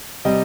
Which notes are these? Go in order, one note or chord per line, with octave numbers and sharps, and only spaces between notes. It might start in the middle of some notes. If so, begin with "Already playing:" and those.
C3 G3 D#5